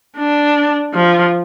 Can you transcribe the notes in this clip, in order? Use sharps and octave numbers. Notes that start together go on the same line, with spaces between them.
D4
F3